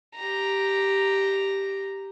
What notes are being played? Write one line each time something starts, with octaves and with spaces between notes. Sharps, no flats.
G4 A#5